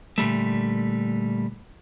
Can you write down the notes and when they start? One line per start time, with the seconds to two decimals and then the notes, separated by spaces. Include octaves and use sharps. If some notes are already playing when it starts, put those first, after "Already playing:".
0.18 A#2 D3 G3 A3